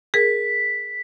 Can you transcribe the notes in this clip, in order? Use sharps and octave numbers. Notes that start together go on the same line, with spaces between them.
G#4 A#4 B6